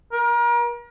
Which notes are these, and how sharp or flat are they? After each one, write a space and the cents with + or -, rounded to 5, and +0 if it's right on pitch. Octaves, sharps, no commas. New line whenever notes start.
A#4 +35